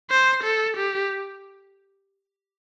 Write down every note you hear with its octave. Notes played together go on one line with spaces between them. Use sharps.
C5
A4
G4